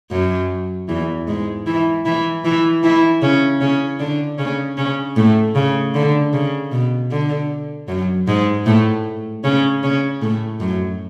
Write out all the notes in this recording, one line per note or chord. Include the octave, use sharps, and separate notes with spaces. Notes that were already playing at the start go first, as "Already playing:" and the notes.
F#2 F#3
E2 E3
G#2 G#3
E3 E4
E3 E4
E3 E4
E3 E4
C#3 C#4
C#3 C#4
D3 D4
C#3 C#4
C#3 C#4
A2 A3
C#3
D3
C#3
B2
D3
F#2 F#3
G#2 G#3
A2 A3
C#3 C#4
C#3 C#4
A2 A3
F#2 F#3